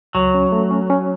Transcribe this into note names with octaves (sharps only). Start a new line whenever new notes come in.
C#2 F#3
C#4
A3
C#4
C#4